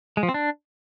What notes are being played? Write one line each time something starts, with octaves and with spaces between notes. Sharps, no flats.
G#3
F3
C4
D4